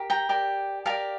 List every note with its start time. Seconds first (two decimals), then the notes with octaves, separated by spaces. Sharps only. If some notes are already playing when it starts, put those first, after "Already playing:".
Already playing: G4 A#4
0.10 G5 A#5
0.29 G4 A#4 D5
0.85 G4 A#4 D5 F5 A5